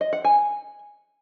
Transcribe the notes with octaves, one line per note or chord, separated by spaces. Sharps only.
D#5
F#5
G#5